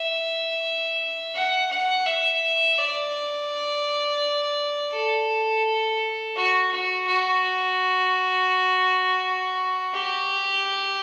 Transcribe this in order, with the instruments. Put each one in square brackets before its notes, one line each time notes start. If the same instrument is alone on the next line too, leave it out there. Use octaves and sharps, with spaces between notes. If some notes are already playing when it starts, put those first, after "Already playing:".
Already playing: [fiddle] E5
F#5
F#5
E5
D5
A4
F#4
F#4
F#4
G4